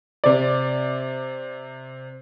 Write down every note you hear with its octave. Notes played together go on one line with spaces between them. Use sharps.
C3 D5